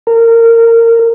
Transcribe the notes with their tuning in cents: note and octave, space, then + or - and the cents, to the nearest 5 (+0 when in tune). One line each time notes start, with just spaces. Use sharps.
A#4 -20